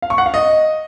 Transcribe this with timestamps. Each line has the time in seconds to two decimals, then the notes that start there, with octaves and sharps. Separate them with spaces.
0.02 F5
0.10 C#6
0.18 F#5
0.26 F5
0.34 D#5